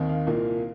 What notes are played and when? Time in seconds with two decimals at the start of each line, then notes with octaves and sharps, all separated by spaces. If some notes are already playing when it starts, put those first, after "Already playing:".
Already playing: D#2 D#3 C4
0.09 F5
0.27 C2 A#2 A#3